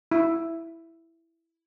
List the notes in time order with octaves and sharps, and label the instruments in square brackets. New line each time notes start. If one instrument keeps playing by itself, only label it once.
[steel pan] E4